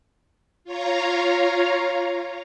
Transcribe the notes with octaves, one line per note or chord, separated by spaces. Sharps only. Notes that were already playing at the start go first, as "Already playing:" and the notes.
F4 C#5 F5 A#5